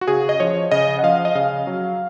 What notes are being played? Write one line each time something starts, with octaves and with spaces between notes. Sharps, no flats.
F#4
C#3 G#4
D#5
F3 C#5
C#3 D#5
F#5
F3 F5
D#5
C#3 F5
F#3